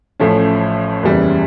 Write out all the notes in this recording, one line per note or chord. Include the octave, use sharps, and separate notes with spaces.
A1 A2 F3 A3 C#4
F#1 E2 C#3 E3 G3